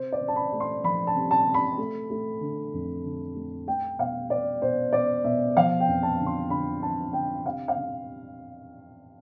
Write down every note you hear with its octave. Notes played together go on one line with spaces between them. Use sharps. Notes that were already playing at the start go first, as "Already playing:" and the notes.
Already playing: C3 C5
D5
C3
A5
B5
A3
C6
F3 B5
A5
C3
A5
C3
B5
A3
A3
D3
F2
D3
A3
A3 G5
B2 F5
B2 D5
B2 C5
B2 D5
B2 E5
F3 F5
G5
F2
A5
D3
C6
D3 B5
F2 A5
D3 G5
C3 F5
F5
C3